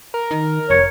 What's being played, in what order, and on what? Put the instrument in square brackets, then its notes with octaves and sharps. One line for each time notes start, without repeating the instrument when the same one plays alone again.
[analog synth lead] A#4
[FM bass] D#3
[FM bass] F1 [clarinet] C#5